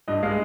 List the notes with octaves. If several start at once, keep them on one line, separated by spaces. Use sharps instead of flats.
G2 D#5
G#3 F5